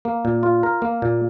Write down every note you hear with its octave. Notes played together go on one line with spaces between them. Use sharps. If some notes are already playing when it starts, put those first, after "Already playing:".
A#3
A#2
F4
A#4
A#3
A#2